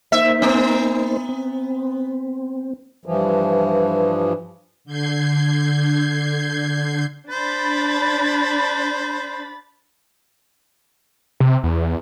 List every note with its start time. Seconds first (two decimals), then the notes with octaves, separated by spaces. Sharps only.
0.12 A#3 D#4 C5 E5
0.42 B3
1.29 C4
3.06 G2 E3 F3
4.84 D3 G6 G#6 C7
7.30 D4 C5 B5 A6
11.40 C3
11.64 E2